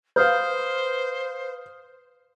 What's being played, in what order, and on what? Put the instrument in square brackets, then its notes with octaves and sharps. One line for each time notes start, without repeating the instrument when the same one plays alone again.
[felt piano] B4 F5 [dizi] C5 [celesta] D#6 F6 G6